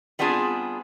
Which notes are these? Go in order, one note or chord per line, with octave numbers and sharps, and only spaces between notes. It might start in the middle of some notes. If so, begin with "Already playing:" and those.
G3 B3 C4 D4 F4 G#4